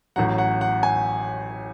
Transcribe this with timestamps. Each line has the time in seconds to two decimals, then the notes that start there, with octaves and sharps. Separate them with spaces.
0.16 A1 A2 F#3 F#5
0.38 F#5
0.61 F#5
0.83 G#5